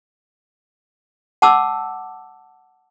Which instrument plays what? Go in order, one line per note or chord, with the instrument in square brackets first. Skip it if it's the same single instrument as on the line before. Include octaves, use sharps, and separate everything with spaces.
[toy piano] F#5 A5 D6 E6